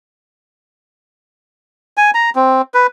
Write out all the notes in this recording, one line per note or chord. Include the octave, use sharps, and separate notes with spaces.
G#5
A#5
C4
B4